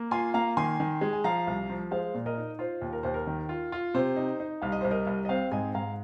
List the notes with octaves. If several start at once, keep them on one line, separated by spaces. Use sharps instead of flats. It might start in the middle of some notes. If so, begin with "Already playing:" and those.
Already playing: A#3
F4 G#5 C6
A#3 F5 A#5
D#3 G#5 C6
D#3
G#3
G#5
F3 F5 A#5
C2
F3
G#3 C5 F5
A#2
A#4 D#5
D#4
F4 C5
D#2
A#4
D#2 C5
A#4
D#3
F4
F4
C3 C5
D#4
D#4
C2 F5
D#5
C2 C5
A#4 D#5
C2
D#5
C4 C5 F5
G#2 D#5 G#5
G#2 F5 A#5